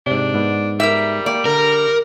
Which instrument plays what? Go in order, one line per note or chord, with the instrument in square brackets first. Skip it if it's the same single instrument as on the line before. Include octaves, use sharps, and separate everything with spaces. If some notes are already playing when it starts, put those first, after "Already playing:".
[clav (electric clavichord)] G#2 C3 [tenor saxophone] D4
[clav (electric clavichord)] G#2 B3
[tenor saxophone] G3 [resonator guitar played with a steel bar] A#4 E5
[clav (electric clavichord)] A#3 G4 [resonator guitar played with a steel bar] D5
[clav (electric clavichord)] D3 [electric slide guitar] A#4